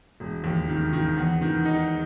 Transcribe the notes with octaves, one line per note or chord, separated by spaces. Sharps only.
E1
D#2
D#3
D#3
E2
D#3
D#4